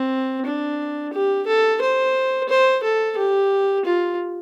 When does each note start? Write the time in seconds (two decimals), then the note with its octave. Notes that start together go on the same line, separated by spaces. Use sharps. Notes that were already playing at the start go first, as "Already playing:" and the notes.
Already playing: C4
0.46 D4
1.13 G4
1.47 A4
1.81 C5
2.49 C5
2.83 A4
3.17 G4
3.85 F4